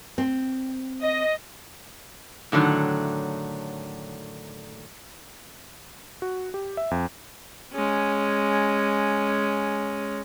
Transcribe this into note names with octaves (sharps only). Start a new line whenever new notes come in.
C4
D#5
A2 D3 D#3 F#3
F#4
G4
E5
F2
G#3 C#4